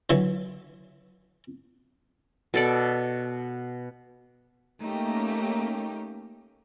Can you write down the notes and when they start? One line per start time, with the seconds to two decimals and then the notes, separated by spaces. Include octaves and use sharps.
0.10 D3 E3 F#3
2.54 B2 A4 D5
4.83 A3 A#3 C#4 D#4 G4